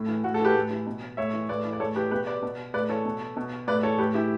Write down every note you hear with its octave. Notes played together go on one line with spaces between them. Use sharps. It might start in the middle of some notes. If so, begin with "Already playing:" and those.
Already playing: A2
E3
A2 F#4
F#4 A4
E3 G4 B4
A2
E3
B2
A2 C#5 E5
E3
A2 B4 D5
E3
D5
A2 A4 C#5
E3 G4 B4
B2 G4 B4
B4 D5
B2
A2 B4 D5
E3 A4 C#5
B2
B2
A2 B4 D5
E3 A4 C#5
A2 G4 B4
E3 E4 G4